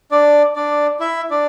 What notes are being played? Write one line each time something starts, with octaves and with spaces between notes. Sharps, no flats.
D4 D5
D4 D5
E4 E5
D4 D5